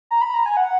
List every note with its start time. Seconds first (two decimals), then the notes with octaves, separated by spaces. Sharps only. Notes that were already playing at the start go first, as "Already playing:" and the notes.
0.11 A#5
0.21 B5
0.34 A#5
0.46 G#5
0.57 F#5